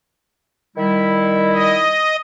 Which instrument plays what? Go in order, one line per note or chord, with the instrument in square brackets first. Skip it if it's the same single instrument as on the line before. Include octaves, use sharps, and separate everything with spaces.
[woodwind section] D#3 G3 E4
[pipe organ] D#5